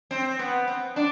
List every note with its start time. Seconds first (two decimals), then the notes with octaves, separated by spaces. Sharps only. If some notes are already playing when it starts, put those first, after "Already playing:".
0.11 C4
0.39 B3
0.67 C4
0.96 D4